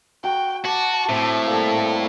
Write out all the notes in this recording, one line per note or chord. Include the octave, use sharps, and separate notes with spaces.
F#4 G5
F#4 A5 D6
A2 C4 E5
G3 A#3 A4